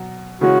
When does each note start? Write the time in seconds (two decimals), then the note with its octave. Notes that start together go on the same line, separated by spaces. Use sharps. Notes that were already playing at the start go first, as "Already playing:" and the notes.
Already playing: B2 F#3
0.41 C#3 E3 G#3 C#4 F#4